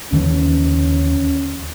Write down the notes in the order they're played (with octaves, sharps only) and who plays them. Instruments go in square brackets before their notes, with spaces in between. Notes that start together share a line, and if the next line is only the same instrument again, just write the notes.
[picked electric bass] D#2 D3 E3 [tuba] C#4